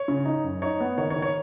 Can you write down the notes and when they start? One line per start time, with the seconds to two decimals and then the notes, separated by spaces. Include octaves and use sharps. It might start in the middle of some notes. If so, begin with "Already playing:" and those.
Already playing: C#5
0.08 C#3
0.25 D#4
0.44 F#2
0.62 D#4 C#5
0.80 B3
0.98 D#3 C#5
1.10 C#5
1.16 D#3
1.22 C#5